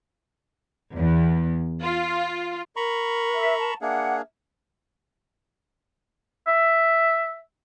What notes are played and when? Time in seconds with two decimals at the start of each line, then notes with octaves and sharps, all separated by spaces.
0.95 E2
1.82 F4
2.76 A#4 A#5 B5 C#6
3.35 E5
3.59 A5
3.81 A#3 D4 G#4 E5 F#5
6.48 E5